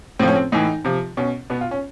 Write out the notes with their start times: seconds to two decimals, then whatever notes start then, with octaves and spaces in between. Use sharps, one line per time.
0.19 A2 F3 C4
0.28 C#4
0.36 C4
0.52 A2 E3 D#4
0.85 C3 F3
1.17 B2 C#4
1.50 B2 B3
1.61 F4
1.71 C#4